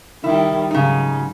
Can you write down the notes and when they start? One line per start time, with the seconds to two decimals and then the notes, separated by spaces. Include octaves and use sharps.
0.24 D#3 G3 E4
0.71 G#2 C#3 F#3 D#4